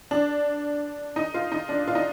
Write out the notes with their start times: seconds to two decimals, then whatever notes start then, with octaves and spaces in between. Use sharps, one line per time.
0.11 D4
1.16 D#4
1.34 F4
1.52 D#4
1.69 D4
1.87 F4
1.95 D#4